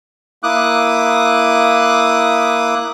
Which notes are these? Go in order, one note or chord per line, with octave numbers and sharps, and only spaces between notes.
A#3 E4 D6 D#6 F#6